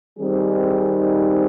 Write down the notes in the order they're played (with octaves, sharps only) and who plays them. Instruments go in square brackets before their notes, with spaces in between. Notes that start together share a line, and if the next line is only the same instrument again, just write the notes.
[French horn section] D#3 G3 C4 D#4 G#4